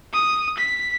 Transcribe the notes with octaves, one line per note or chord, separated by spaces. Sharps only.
D#6
B6